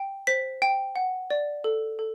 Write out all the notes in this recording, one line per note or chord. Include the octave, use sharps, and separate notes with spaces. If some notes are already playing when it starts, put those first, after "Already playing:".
Already playing: G5
C5 B6
G5
F#5
D5
A4
A4